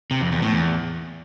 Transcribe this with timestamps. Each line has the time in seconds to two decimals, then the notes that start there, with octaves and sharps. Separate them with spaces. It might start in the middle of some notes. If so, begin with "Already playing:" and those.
0.11 C3
0.21 F2
0.32 E2
0.42 A2
0.53 E2